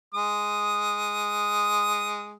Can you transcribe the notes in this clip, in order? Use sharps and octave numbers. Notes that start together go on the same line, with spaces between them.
G#3 D#6